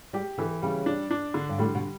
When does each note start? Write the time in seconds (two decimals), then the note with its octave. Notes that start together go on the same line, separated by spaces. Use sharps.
0.13 G3 G4
0.38 D3 E3
0.62 C#3 G3
0.86 D4
1.11 D4
1.34 D3
1.49 G2
1.58 A2 G3
1.75 B2